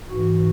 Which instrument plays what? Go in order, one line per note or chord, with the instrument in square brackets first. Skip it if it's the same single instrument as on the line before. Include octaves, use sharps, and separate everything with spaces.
[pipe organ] G#2 E3 F#4